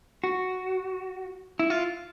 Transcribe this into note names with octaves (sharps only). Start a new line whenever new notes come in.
F#4
E4
F4